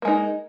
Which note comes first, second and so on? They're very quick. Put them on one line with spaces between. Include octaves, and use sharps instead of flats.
A#3 G#3 D#4